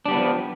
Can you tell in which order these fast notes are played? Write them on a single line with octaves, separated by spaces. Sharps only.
D4 G3 B3 E3 F3